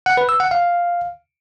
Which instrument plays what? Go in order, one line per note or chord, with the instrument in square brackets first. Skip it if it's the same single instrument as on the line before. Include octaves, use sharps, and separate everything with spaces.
[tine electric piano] F#5
B4
E6
F#5
F5